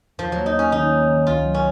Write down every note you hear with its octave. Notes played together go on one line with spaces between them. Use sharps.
D#2 F3
F#3 A#3
D#4
A#3 C#4
D#3 D#4
A#3
D#3
C#2 F4
F#3
C#4